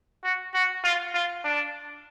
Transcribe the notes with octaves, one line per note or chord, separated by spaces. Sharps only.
F#4
F#4
F4
F4
D4